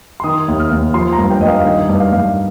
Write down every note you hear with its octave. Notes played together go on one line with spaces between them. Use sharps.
C6
D#3 D#6
D#2
F6
D#2
F3 C6
A#5
G2
G5
G2 D#5
F5
D#3 D#5
G2
F5
G2